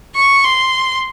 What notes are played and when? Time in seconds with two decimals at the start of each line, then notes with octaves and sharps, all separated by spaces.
0.15 C#6
0.44 C6